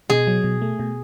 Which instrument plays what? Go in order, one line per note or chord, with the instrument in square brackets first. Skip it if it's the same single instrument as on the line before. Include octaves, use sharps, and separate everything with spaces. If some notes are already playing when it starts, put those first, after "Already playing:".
[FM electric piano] B2 [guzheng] G#4
[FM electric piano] F#3
B2
A3
B2